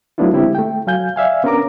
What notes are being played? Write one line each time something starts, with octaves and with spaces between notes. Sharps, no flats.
F#3 A3 B3 D4 E4 F4
D3 G#3 C4 E4 G4
A3 G5
F#3 F5 G#5 G6
D5 E5 F5 G#5
B3 C#4 D4 A#4 A#5 D6